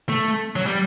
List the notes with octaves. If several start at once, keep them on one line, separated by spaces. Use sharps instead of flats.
A3
F#3
G3